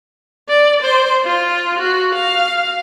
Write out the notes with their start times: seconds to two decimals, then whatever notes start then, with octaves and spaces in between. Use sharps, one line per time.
0.49 D5
0.82 C5
1.25 F4
1.79 F#4
2.15 F5